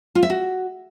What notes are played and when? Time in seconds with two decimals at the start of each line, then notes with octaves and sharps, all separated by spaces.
0.15 F4
0.23 E5
0.30 F#4